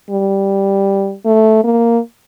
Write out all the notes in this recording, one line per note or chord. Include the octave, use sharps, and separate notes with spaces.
G3
A3
A#3